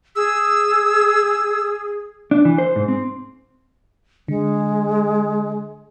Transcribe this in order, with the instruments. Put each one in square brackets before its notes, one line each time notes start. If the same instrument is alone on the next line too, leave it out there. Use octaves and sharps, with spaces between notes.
[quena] G#4 [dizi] E6
[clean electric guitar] D4
E3
C5
G#2
C4
[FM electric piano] D3 [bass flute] G#3